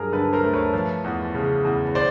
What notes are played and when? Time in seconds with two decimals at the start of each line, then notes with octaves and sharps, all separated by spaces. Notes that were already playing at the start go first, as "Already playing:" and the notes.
Already playing: G2 F#3 G#4 A#4
0.12 D3 A4 B4
0.33 A#4 C5
0.43 A3
0.53 B4 C#5
0.74 F3
1.04 E2
1.35 C#3
1.65 E2
1.95 C5 D5